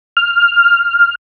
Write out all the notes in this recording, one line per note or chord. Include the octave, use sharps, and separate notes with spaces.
F6